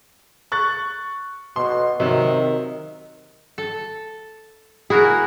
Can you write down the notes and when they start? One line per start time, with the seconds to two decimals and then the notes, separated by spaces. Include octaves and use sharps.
0.52 C#6 F#6 A6
1.56 B2 C6
2.00 C3 D#3 F#3
3.58 A4
4.90 E4 F#4 G#4 A#4